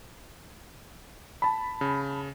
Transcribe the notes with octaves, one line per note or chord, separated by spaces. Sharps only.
A5 B5
C#3